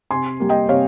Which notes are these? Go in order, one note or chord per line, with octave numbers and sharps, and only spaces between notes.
C3 G#5 C6
G3 A#3
D#5 G5
C3 C#5 F5